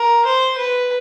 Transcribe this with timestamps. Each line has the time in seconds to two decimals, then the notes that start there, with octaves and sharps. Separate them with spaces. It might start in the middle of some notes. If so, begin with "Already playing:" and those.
Already playing: A#4
0.25 C5
0.58 B4